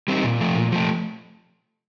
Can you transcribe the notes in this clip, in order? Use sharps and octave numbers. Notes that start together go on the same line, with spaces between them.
G3 C4 D#4
A#2
F3 A3
A#2
F3 A3